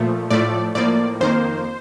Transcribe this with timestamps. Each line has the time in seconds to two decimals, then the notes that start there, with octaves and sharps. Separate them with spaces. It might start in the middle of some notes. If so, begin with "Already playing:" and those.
Already playing: A#2 F3 A3
0.30 A2 F3 A3 D5
0.75 A2 F3 A#3 D5
1.21 F2 D#3 A#3 C5